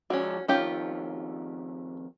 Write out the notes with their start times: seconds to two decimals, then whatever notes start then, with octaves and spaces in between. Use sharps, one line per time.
0.10 F3 G#3 C#4 F#4 D5
0.48 F2 D#3 C#4 F4 G4